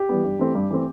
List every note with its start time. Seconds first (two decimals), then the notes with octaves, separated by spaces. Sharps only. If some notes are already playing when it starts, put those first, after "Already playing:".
Already playing: G4
0.09 E3 G3 B3
0.24 G2
0.39 E3 A3 C4
0.55 G2
0.70 E3 A3 C4